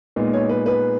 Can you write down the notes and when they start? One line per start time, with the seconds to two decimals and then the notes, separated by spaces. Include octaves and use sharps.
0.16 A#2 G#3 B3 D#4
0.33 C#5
0.49 B4
0.66 B4